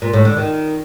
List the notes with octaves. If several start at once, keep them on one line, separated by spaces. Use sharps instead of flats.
A#2
A2
D3
D#3